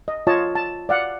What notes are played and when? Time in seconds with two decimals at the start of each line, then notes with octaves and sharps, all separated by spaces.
0.08 D#5
0.27 F4 C#5 D#5 A5
0.55 A5
0.89 D5 F5 F#5